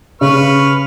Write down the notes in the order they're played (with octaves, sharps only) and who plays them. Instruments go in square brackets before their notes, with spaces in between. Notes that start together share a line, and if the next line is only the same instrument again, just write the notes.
[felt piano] C#3 [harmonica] B4 C#6 F6